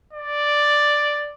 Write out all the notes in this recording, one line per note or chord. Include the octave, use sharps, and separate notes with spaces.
D5